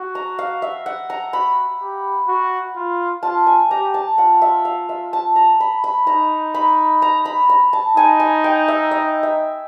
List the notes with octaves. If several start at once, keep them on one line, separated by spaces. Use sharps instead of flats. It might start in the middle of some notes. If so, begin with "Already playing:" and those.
Already playing: F#4
A#5
F5
E5
F#5
A#5
F#4 B5
G4
F#4
F4
F4 A5
G#5
G4 A#5
A5
F4 F#5
E5
F5
E5
A5
A#5
B5
B5
D#4 A#5
B5
A#5
B5
A#5
A5
D#4 G#5
G#5
G5
E5
D#5
E5